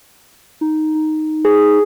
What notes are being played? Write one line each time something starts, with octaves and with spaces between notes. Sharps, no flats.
D#4
D#4
G#4